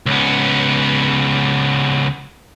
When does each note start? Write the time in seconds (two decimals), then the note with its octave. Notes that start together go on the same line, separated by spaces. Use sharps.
0.06 C#2 B3